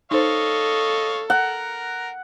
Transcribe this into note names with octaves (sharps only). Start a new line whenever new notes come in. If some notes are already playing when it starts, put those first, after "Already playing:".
D#4 A4 C5 C#5 D#5 F5
A#4 F#5